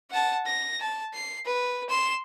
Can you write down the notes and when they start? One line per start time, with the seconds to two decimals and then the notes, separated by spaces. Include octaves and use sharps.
0.11 F#5 A5
0.46 A#6
0.80 A5
1.14 C7
1.46 B4
1.90 C6 E7